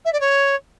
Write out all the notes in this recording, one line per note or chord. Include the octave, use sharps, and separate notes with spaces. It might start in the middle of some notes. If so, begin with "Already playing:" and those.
E5
D5
C#5